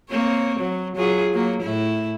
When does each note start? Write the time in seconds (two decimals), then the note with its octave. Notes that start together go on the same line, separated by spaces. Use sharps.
0.10 A#3 C4 C#5
0.60 F#3
0.96 F#3 F4 G#4
1.34 F#3 A#3
1.62 A2 E4